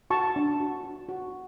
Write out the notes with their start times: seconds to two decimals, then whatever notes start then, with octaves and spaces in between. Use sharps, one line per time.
0.10 F#4 A5 C#6
0.36 D4
0.60 F#4
0.84 F#4
1.09 F#4